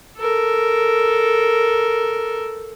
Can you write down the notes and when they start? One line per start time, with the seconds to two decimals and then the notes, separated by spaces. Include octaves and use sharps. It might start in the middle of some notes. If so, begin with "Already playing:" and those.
0.18 A4 A#4